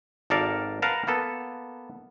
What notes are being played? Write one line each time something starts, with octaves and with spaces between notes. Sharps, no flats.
G#1 A4 A#4 D5 F5
A#4 B4 F5 F#5 A5 A#5
A#3 B3 A4 B4